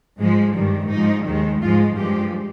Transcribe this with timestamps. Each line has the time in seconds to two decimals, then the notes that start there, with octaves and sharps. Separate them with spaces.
0.19 G#2 F3 G#3
0.55 G2 D#3 G3
0.89 G#2 F3 G#3 D#4
1.25 D#2 D#3 G#3
1.60 G#2 F3 G#3 F4
1.96 G2 F3 G#3 G4